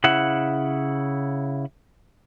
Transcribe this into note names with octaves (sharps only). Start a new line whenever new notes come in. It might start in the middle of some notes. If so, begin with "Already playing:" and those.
C#3 E4 F#5